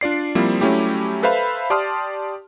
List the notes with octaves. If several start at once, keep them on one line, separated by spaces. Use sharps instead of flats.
D4 F4 D5 C7
F3 G3 A#3 C4 E4
F#3 G3 A3 C#4 E4 G4
A4 B4 C5 E5 F5 B5
G4 D5 A5 C6 D#6 F6